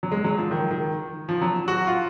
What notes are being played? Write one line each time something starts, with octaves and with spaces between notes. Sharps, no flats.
F#3
G#3
F#3
F3
D#3
D#3
F3
F#3
F#4
F4